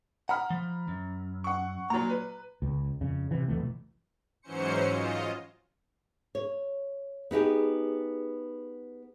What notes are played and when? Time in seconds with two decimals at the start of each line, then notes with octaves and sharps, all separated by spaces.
0.29 F#5 A#5 B5 F6
0.51 F3
0.88 F#2
1.44 F#5 C#6
1.90 A#2 F#3 A#5
2.09 B4
2.62 C#2
3.01 F2 C#3
3.31 C3 E3
3.48 F1 B1 E3 A3
4.42 G#2 E3 F#3 C#4 C5 C#7
4.91 F4 D#5
6.35 C#5
7.31 B3 D#4 G4 G#4